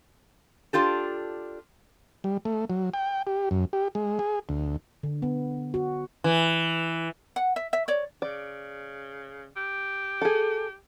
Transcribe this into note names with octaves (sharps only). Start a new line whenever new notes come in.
D4 F4 G4 A4
G3
A3
F#3
G5
G4
F#2
G4
G#3
G#4
D2
D3
B3
F#4
E3
F#5
E5
E5
C#5 D5
C#3 D5
G4
G#4 A4